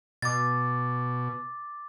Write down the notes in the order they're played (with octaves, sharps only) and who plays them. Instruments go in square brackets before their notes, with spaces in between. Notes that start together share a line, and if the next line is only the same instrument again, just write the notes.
[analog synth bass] B2 [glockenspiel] D6 A6